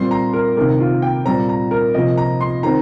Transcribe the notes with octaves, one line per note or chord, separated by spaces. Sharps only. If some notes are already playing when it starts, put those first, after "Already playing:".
Already playing: A#2 G3 C4 C6
A#5
A#4
C3 D#3 A#3 A#4
F4
G5
A#2 G3 C4 A#5
A#5
A#4
C3 F3 A#3 D#5
A#5
C6
D#3 C4 A#5